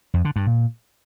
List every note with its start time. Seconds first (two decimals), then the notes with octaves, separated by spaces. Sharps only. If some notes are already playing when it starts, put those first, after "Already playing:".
0.14 F2
0.25 D3
0.36 G2
0.47 A#2